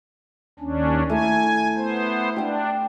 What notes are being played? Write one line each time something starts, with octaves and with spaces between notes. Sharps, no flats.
D#2 C#4 D4
A3 E4 G#5 A#5
B3 C5
D4 G4 F5